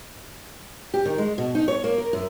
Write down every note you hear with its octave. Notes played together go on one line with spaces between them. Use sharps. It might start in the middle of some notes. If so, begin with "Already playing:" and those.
G4
D#3
G#3
B2
D#4
C#5
A#3
A#4
F#2